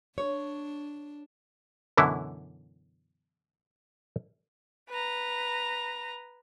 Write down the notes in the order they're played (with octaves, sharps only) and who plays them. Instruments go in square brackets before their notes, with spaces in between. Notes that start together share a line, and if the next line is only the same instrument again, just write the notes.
[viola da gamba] D4 [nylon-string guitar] C#5
[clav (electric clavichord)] F#2 B2 D3 E3 E4
[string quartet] B4 A#5